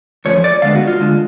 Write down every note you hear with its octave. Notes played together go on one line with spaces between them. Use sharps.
F2 F3 A3 C#4 C#5
D5
D3 G#3 B3 D4 F5
F#4
F4
D3 G#3 D4